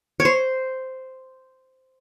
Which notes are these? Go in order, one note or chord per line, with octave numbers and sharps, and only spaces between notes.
C#5
C5